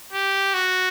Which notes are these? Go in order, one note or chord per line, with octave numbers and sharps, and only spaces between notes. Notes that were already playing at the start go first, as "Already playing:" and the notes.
G4
F#4